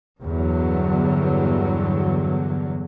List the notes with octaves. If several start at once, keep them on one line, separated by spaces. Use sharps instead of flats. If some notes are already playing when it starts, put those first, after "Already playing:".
E2 G2 D3 F#3